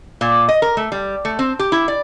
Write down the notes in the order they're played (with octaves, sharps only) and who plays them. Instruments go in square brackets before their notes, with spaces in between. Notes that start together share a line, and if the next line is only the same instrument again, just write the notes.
[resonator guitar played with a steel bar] A#2
D#5
A#4
A3
G3
A3
C4
G4
E4
D5